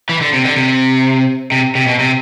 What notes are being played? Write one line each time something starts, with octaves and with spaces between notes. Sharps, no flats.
E3
D3
C3
D3
C3
C3
C3
B2
C3